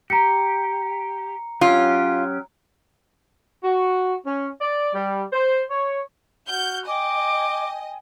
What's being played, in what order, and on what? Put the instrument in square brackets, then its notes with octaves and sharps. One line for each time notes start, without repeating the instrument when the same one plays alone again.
[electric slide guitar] G4 [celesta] A#5 C#7
[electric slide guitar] F#3 C#4 G4 [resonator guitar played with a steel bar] F4
[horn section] F#4
C#4
D5
G3
C5
C#5
[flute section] F#4 F#5 F6 [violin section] G6
[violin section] D#5 [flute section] G5 G#5 [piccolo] D6